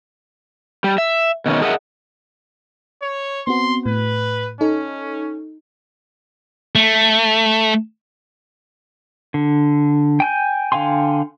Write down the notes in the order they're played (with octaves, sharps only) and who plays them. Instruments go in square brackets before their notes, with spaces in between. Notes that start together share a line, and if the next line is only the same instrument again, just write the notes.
[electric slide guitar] G3
E5
B2 D#3 C#4
G#4 A#4 D#5 E5 F#5
[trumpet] C#5
[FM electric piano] B3 C4 F#4 [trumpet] C6
[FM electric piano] A2 [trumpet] B4
[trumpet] C#4 [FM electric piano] D#4 A4
[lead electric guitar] A3
[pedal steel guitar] D3
G5 G#5 G6
D3 F5 G5 G#5 C6